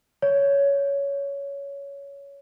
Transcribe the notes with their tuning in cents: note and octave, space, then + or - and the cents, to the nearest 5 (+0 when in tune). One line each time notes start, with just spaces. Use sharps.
C#5 +15